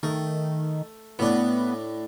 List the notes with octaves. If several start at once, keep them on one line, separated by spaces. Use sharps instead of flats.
D#3 A3
A2 B3 D4